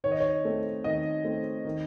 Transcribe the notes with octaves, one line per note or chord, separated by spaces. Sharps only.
D#3 C#5
D#5
C#5
A3 C4
D#3 D#5
A3 C4
D#3